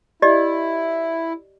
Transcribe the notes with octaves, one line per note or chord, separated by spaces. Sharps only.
E4 G4 D5 D#5